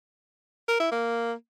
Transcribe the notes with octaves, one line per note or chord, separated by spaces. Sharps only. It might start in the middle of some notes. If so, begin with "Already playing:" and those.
A#4
E4
A#3